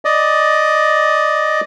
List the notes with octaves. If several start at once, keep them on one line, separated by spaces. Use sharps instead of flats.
D5 D#5